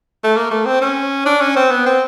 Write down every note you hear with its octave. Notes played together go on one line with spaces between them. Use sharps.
A3
A#3
A3
C4
C#4
D4
C#4
C4
B3
C4